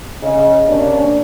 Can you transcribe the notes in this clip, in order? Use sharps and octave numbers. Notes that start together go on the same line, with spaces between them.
C#3 C#4 D#5
C3 A#3 C#4 D4